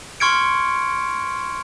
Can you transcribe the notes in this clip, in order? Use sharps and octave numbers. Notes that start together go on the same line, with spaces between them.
C6 C#6 F6 G#6 C#7 D7